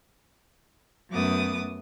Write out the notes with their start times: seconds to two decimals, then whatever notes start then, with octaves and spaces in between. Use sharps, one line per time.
1.11 F#2 F#3 A3 B3 D6 D#6